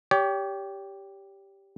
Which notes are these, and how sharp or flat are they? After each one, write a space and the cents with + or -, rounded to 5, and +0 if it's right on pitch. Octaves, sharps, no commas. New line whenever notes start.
G4 +0 C#5 +35